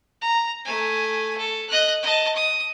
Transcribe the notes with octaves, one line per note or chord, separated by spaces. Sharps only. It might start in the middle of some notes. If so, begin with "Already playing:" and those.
A#5
A3 G#5
A4
D#5 F#6
D#5 A5
D#6